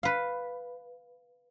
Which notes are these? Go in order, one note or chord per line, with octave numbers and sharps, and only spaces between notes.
B4 F5